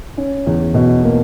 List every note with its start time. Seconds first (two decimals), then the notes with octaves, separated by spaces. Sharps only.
0.17 C#4
0.47 E2
0.74 B2
1.03 A#3